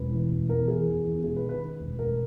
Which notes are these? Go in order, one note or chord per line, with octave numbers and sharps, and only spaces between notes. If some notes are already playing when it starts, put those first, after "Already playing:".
Already playing: E1 B4
E3
E1
E2 A#4
E3 G#4
E2
E2
E1 G#4
B4
D#3
B4
D#3
E1
E1 A#4